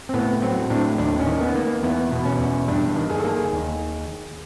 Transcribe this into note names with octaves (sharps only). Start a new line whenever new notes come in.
C4
A2 B3
F#3 C4
A2 D4
D#2 D4
C#4
D#3
B3
A#3
E2 B3
B2
C#4
E2
G2 D4
D#3
G#4
A4
A#3 G#4
D#2